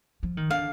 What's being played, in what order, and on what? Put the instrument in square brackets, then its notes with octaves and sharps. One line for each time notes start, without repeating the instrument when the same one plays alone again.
[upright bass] F3
D#3
[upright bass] D3 [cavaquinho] F5